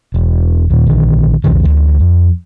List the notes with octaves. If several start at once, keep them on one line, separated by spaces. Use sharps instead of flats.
E1
D#2 A#2
A#1 D3 D#3
B1 E2 B2 D#3
D2 D3 E3
F2